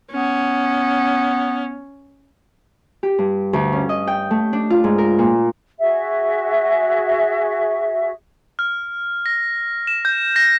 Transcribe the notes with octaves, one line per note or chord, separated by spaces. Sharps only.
B3 C#4
G4
G2
D2
C#4
D#5
G5
A3
D4
F4
G#2
A#4
A#2
F#4 G#4 E5
F6
A#6
E7
G6
A#6